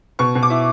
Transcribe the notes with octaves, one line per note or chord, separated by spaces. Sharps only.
B2 C#6
B2
D6
E4